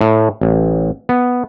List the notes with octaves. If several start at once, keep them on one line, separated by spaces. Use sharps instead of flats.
A2
A1
B3